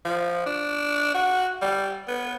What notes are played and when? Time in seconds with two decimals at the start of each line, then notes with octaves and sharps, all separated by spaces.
0.05 F3
0.46 D4
1.15 F#4
1.62 G3
2.08 B3